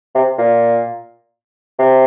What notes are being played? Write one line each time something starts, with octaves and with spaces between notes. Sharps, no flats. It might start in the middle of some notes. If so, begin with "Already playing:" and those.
C3
A#2
C3